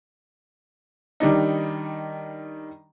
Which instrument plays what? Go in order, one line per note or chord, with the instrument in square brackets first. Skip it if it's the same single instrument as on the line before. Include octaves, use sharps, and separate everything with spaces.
[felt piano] D#3 G3 D4 D#4